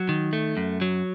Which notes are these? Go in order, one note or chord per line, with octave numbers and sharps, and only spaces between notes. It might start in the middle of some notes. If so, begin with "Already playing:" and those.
Already playing: F#3
D#3
A3
F#2
F#3